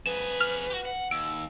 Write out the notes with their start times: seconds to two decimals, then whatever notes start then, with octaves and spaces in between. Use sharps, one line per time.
0.06 F2 G#4 B4 E7
0.40 F6
0.70 F#4 G4
0.85 F#5
1.11 D#2 E6 D7